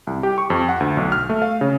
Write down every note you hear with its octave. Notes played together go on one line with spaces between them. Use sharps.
C2
G4
C#6
F2
F#5
D2
B1
F6
A3
F5
C#3